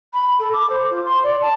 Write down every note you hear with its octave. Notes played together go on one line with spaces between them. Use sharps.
B5
A4
D6
C5
F4
C6
D5
A5